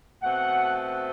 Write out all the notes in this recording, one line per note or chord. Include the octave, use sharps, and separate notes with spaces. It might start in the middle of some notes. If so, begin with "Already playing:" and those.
B2 A3 C4 F#5